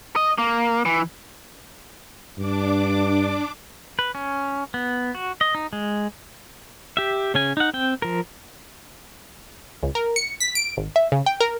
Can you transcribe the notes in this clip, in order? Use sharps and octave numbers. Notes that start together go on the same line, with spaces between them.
D#5
A#3
E3
G2 D4 D6
B4
C#4
B3
F#4
D#5
D#4
G#3
G4 E5
C#3 C#4 G#5
D#4 F#5
C4 G5
F3 A#4
C#2
A#4
C#7
B6
D7
G#1
E5
C#3
G5
A#4